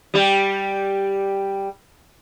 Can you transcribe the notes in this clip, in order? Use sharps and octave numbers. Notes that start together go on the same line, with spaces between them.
G3 G4